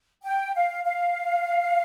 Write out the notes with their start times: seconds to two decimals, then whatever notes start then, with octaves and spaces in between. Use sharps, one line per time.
0.24 G5
0.55 F5
0.85 F5